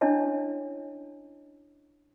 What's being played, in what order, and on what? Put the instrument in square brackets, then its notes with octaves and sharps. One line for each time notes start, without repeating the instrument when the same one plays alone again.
[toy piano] C#4 D4 E4 C#5 D#5 A5